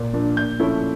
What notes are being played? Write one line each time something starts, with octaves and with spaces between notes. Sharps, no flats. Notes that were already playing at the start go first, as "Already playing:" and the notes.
Already playing: A#2
F3 A#3 D4
A#2 G6
F3 A3 C#4 E4